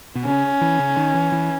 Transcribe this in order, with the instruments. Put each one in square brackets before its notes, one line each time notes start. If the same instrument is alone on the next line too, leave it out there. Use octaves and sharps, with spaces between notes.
[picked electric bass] B2
[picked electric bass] C#3 [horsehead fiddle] C#4
[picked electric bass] E3
C#3
D#3
E3
E3